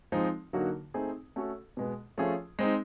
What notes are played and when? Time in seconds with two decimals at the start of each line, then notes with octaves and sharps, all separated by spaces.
0.12 F3 G#3 C4 D#4
0.53 D3 F#3 A#3 D#4 F#4
0.94 A3 C4 D#4 G#4
1.36 A3 C#4 F#4 A4
1.77 B2 G#3 B3
2.18 F3 A3 C#4 F4 G#4
2.59 G#3 C4 D#4